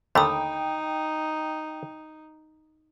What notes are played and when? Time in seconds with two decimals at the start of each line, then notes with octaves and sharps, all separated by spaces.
0.15 D#2 D3 A3 D#4 G5 A#5 B5 D#6